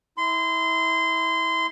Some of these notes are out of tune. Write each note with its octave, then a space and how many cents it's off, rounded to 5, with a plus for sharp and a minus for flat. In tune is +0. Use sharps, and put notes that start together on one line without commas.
E4 -25 C6 -25